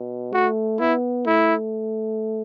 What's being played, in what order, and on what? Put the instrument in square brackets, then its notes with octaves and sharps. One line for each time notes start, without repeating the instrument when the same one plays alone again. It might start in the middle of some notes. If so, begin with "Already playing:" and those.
Already playing: [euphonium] B2
[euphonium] A3 [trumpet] F#4
[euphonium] B3 [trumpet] E4
[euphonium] A3 [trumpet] E4